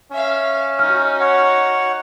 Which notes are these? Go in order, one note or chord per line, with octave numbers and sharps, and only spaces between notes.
C#4 E5 F5
D#4 F#4 F6
C#5 F#5